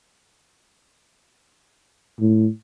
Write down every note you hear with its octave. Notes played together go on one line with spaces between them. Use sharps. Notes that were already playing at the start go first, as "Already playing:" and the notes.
A2